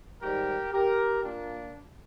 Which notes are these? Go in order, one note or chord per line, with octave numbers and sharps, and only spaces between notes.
G#2 D#3 G3 G4 A#4
G4 A#4
A#2 A#3 D4